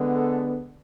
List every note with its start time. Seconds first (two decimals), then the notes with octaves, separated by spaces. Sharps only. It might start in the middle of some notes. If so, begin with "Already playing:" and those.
Already playing: D3 G#3 B3
0.15 A4